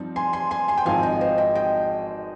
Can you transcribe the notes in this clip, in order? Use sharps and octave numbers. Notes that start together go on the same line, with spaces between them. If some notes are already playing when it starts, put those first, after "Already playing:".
Already playing: G2 F3 C4 D#4
G#5 C6
G#5 C6
G#5 C6
G#5 C6
G5
G#1 G#2 F3 C4 F5 G#5
D#5 G5
C5 D#5
D#5 G5
D#5 G5